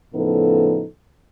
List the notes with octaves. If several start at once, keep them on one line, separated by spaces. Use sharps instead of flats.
A2 C#3 F3 B3 D#4 A4